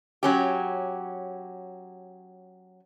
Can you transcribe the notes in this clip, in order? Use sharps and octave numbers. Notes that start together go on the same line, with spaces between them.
F#3 C#4 G4